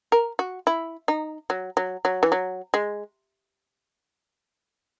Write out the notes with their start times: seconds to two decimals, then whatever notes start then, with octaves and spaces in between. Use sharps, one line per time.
0.12 A#4
0.39 F#4
0.67 E4
1.08 D#4
1.50 F#3
1.77 F#3
2.05 F#3
2.23 E3
2.32 F#3
2.74 G#3